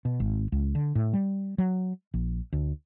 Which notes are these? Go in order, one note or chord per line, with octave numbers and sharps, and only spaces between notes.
B2
G#1
C#2
D3
A2
G3
F#3
A#1
D2